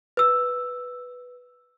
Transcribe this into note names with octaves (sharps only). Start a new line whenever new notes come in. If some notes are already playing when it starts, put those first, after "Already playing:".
B4 E6